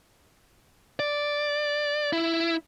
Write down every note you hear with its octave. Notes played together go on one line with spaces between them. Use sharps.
D5
E4